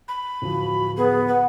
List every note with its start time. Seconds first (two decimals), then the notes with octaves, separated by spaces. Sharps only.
0.08 B5
0.42 D1 F3 F#4
0.97 B3 G#4 B4
1.28 B4 F#5